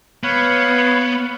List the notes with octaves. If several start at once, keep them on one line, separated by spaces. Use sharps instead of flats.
B3 B4 C#5 F5